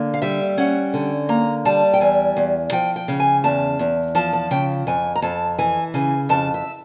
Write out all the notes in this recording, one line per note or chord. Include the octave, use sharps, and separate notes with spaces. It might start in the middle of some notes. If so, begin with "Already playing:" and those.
Already playing: D3 A#3
F5
G3 E5
C#4 F#5
D3
A#3 A#5
G3 A5
G5
E2 G#5
E2
F3 G5
G5
C#3
G#5
E2 A5
E2
F3 A5
A5
C#3 G5
F2 G#5
A#5
F2 A5
E3 G#5
C#3 G#5
F2 A5
E5